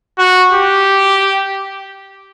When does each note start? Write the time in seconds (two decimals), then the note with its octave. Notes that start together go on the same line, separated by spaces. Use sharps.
0.19 F#4
0.53 G4